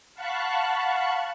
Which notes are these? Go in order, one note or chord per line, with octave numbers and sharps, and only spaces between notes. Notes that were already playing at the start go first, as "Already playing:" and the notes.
F5 F#5 A5 B5 C#6 F#6